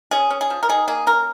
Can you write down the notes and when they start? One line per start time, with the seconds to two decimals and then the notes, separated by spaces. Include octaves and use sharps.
0.11 C#4 G#4
0.30 C#4
0.41 G#4
0.50 F3
0.63 A#4
0.69 D#3 G#4
0.88 A#3 G#4
1.07 C#4 A#4